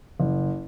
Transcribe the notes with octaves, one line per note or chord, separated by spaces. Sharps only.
F#1